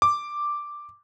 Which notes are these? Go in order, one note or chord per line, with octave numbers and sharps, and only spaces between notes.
D6